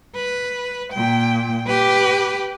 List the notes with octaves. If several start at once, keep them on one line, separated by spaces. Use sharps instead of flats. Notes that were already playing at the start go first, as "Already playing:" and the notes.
B4
A#2 G5
G4 B4